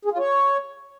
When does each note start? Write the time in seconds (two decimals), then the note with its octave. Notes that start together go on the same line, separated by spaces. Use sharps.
0.05 G#4
0.12 F4
0.19 C#5